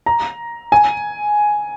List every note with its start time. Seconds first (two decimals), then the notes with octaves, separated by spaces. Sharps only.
0.06 A#5
0.72 G#5